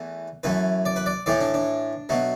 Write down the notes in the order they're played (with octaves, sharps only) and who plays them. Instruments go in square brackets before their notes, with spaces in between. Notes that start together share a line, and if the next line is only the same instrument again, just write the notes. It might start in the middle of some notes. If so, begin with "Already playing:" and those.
Already playing: [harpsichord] E2 E3 A3
F#2 E3 A3 B4
D5
B4
D5
A2 E3 A3 D5
D4
D4
B2 F#3 A3